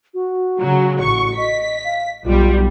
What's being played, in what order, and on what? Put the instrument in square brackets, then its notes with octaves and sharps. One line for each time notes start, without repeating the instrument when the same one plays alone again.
[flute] F#4
[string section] C#3 F#3
A1 C#6
[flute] D#5 [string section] B6
[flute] F5
[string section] B1 G3 [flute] F4